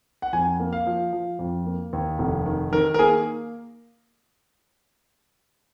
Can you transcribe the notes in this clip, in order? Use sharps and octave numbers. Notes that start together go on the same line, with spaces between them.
F#5
F2 G#5
A#3
F5
F3
F3
F2
A#3
D#2
F1
D#3
D#3 A#4
A#4
A#3 G#4